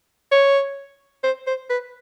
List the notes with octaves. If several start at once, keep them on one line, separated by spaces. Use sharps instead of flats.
C#5
C5
C5
B4